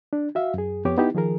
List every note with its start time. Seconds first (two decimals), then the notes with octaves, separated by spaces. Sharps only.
0.13 D4
0.35 F#4 E5 F5
0.54 F#2 G#4
0.85 F2 B3 G4 C#5 D6
0.98 B3 D#4 E4 G4
1.15 D#3 F3 G#4 A#4